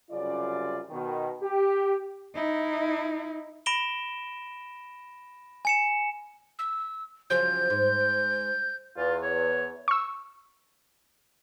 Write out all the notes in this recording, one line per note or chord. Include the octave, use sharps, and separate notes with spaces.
C2 F#2 C#3 F4 D5
B2 D#3
G4
D#4 E4
B5 A#6 D7 E7 G7
G#5 C#7 E7
E6
C#3 F3 F#3 G6
G#2
E2 F4
C#5
C#6 E6